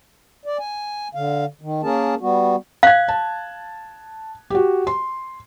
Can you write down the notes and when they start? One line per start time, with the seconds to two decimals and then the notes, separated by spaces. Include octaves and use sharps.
0.45 D5
0.59 G#5
1.15 D3 F5
1.61 D#3
1.83 A#3 C#4 G#4 A#4 A5
2.21 G3 B3 F#4
2.83 F5 F#6 G#6
3.08 A5
4.50 F#4 G4
4.87 C6